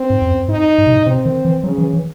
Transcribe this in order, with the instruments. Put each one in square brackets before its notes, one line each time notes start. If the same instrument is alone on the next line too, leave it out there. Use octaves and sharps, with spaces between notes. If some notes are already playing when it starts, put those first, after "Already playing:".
Already playing: [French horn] C4
[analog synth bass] G#2
E2
F#2
[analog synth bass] G#2 [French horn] D#4
[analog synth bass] G#2
C3
A2
[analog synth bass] C3 [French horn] C4
[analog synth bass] D#3
E3
[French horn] C#3 [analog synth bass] F#3
[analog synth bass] E3
E3